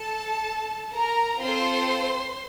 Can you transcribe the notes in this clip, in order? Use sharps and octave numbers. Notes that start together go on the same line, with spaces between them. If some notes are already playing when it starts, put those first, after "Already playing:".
Already playing: A4 A5
A#4 A#5
C4 F4 A4 C5 C6